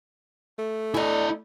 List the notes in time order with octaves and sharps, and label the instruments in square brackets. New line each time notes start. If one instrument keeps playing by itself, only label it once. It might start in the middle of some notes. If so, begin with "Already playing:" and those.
[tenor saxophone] A3
[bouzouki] D4 G#5 [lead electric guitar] E4 D#5